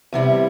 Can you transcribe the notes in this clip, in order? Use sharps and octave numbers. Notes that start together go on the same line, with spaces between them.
E2 C3 G3 E4